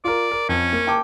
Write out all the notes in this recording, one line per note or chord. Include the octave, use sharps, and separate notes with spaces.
F4 A#4 D5
A#4
F2 C#4
A#3
G5 A5 D6